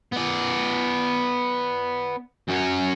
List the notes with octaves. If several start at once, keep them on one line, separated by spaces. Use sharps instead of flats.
B3 D5
F#2 C#4